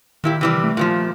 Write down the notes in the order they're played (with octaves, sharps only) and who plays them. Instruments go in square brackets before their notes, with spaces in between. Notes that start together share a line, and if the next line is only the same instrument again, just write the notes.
[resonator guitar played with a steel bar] A#2 E4 G4 [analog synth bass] D#3
[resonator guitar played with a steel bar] C3 E3 G3
[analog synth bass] A3
[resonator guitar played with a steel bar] A#2 E3 F3